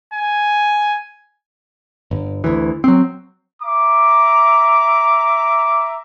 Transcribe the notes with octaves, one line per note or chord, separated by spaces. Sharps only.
G#5
G1
D2 E3
F#3 C4
E5 A#5 D6